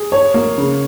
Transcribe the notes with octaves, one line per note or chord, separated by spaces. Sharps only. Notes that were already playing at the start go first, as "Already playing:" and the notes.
Already playing: G#4
C#5
A#3
C#3